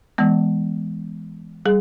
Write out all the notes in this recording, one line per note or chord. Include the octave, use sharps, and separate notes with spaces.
E3 G#3 B3
G3 G#4